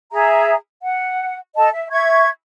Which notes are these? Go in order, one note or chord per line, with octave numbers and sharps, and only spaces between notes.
G#4 E5 A#5
F#5
A4 D#5 A5
E5
E5 C#6 G#6